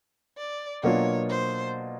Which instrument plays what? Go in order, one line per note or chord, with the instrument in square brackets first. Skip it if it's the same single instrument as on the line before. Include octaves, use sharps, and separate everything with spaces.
[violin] D5
[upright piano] B2 F#3 A#3 D4 F4 [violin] C#5
[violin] C5